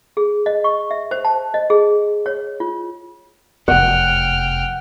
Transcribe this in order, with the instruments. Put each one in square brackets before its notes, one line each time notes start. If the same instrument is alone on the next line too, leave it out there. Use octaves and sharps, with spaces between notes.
[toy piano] G#4
D#5
C#6
E5
C5
A5
D#5
G#4
C#5
F4
[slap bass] F1 E2 [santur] F#5 [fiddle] G5 F6